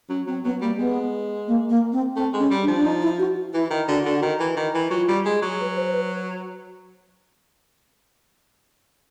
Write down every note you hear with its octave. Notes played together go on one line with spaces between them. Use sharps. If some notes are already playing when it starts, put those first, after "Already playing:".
F#3 C#4
F#3 C4
F#3 B3
G3 A#3
G#3 B3
A#3
A#3
C4
A3 C4
G#3
C#4
G3
D4
F3
D4
D#4
E4
F#4
E3 E4
D#3
D3 F#4
D3
D#3
E3
D#3
E3
F#3 F4
G3
G#3
F#3
B4
C5
C5
B4